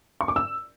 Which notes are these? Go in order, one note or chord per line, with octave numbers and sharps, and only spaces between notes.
C#6
D6
E6